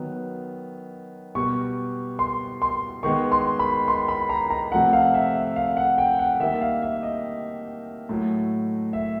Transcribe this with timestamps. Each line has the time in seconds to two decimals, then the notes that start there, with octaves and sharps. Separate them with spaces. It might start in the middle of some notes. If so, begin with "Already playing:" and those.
Already playing: D#3 F#3 B3
1.35 B2 G3 B3 C#6
2.19 C6
2.62 C6
3.03 D#3 G#3 B3 C#6
3.32 C6
3.59 B5
3.88 C6
4.08 B5
4.29 A#5
4.50 A#5
4.72 C3 F3 A3 F#5
4.93 F5
5.14 E5
5.35 E5
5.56 F5
5.77 F#5
5.98 G5
6.19 F#5
6.40 D#3 G3 A#3 E5
6.61 F5
6.82 E5
7.03 D#5
8.09 A2 F#3 A3
8.93 E5